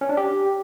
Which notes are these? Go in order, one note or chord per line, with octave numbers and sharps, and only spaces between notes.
C#4
D4
G4